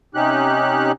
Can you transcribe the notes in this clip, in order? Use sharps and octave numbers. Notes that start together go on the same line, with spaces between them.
C3 C#4 D#4 G4 F#6